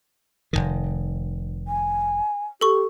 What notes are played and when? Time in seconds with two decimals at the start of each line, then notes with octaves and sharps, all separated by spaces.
0.53 F1 B1 D#3
1.68 G#5
2.61 G4 A4 C#6